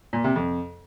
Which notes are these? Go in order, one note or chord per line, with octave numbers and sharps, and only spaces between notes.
A#2
C3
F2